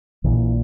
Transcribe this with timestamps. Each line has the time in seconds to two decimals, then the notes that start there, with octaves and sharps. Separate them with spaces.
0.24 A#1 A#2 E3